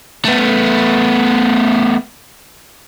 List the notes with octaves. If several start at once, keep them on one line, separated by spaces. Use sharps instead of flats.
A3 B3